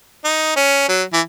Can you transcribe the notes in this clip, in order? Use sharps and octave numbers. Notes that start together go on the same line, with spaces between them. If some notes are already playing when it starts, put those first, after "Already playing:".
D#4
C#4
F#3
E3